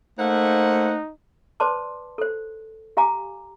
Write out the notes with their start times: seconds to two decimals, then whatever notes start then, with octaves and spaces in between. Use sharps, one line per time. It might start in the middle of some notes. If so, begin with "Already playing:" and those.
0.19 A3 A#3 D#4 C5 F#5
1.60 B4 C5 D5 A5 C6 D6
2.18 A4 C5
2.97 G4 F5 G#5 A#5 D6